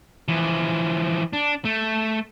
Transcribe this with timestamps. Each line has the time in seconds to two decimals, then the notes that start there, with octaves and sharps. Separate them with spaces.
0.28 E3 F3
1.33 D4
1.65 A3